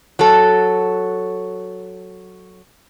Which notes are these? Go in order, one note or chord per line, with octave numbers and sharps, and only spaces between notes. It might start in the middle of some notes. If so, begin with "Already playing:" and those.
F#3 A4